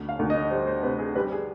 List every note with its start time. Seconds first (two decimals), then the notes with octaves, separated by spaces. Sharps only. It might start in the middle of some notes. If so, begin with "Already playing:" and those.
Already playing: D2
0.09 F5
0.19 D2
0.30 D#5
0.50 G3 C5
0.67 C5
0.83 C3 B4
0.99 G#4
1.15 G3 B4
1.32 G#4